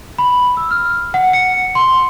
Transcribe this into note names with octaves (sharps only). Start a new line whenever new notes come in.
B5
E6
F6
F#5
C#7
C6